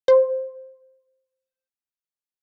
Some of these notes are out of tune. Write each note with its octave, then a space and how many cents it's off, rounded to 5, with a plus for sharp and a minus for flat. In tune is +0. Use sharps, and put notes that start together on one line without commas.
C5 +0